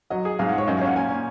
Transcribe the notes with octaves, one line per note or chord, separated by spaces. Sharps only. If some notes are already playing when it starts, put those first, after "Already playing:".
F#3 D#5
G#4
G#2 F5
F#5
F4
C#5
F#2 D#5
F5
C#4 F#5
A#2 G#5
A#2